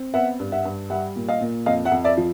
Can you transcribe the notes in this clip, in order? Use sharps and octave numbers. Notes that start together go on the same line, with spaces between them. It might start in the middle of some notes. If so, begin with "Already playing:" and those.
Already playing: C4
B3 E5 F#5
G2
E5 F#5
G2
G3 E5 F#5
A#2
D#5 F5
A#2
F2 D#5 F5
E5 F#5
F2
D5 E5
F3